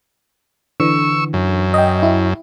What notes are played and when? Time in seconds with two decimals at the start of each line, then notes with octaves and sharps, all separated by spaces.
0.80 D3 E3 C#6 E6
1.33 F#2
1.74 D#5 G5
2.03 E4